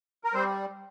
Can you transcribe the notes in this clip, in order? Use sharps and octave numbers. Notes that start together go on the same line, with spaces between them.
A#4
G3 C4 C5